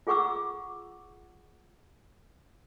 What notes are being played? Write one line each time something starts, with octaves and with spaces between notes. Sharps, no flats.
F4 G#4 F#5 C#6 D6 E6